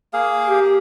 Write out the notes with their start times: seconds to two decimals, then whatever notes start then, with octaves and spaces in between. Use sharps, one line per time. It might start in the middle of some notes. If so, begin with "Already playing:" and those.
0.13 A#3 G#4 F5
0.47 G4